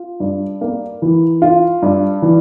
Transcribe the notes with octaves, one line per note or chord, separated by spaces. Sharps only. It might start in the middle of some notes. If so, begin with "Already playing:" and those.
Already playing: F4
G2
A#3
E3
F4
G2
E3